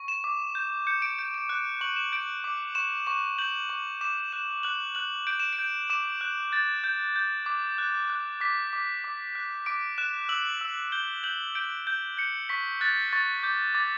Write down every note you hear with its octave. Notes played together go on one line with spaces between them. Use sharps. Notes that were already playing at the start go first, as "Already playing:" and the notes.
Already playing: C#6
E7
D6
G6
G6 C#7
D7
G6 D7
D7
F#6 D7
C#6 F#7
E7
G6 D7
D6
C#6 E7
C#6 E7
G6 F#7
C#6
D6 E7
F#6 E7
F#6 F#7
F#6 F#7
G6 D7
E7
D7
G6
D6 E7
F#6
G6 A6
G6
G6
D6
F#6
F#6
D6 B6
D6
D6
F#6
D6 D7
F#6 E7
E6 F#7
E6
G6 G7
G6 F#7
G6 D7
G6
G6 C#7
C#6 B6
F#6 A6
C#6 A6
D6 G6
D6 A6